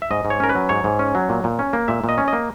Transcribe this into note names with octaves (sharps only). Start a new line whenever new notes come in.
E5
G#2 D#5
G#2
C#5
C#4 A#4
B4
F#3
G#2 C#5
G#2
C#4
F#3
A#2
A#2
C#4
A#3
A#2 E5
A#2
D#5
C#4
A#3 D#5